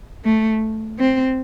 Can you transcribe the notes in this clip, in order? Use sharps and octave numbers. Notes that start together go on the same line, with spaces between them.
A3
C4